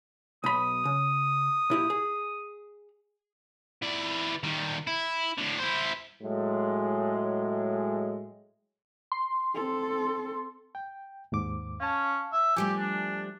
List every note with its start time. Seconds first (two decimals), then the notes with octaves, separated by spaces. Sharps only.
0.44 B1 B5 D#6
0.85 C#3
1.70 A#2 E4 G4
1.90 G#4
3.82 E3 D5
4.43 D#3 G3
4.87 E4
5.38 A2 D3
5.59 E4 C5
6.23 A2 F#3 G#3
9.12 C6
9.54 C4 A4
10.75 G5
11.32 D#2 G#2 D6
11.80 C#4 F5 A5
12.32 E5
12.56 F3 G3 A3 G4 G#5
12.79 D4